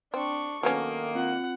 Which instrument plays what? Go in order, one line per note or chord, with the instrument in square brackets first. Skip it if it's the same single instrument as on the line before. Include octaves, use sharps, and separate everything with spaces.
[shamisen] C4 [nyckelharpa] D4 C#6
[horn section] D#3 A#3 [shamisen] F#3 B3 C#4 [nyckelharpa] A4
[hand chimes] C4 F4 [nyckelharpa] F#5